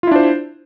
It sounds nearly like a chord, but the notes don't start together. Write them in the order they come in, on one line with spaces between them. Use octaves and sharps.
F4 E4 D4 C5